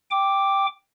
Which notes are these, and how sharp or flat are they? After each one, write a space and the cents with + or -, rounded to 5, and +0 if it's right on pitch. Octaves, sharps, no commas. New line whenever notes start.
G5 +0 D6 +0